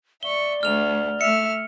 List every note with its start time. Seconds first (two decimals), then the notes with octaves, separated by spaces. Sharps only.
0.23 D5 E5 C#6 G7
0.63 D2 A3 F6 F7
1.21 A3 E5 F6 C#7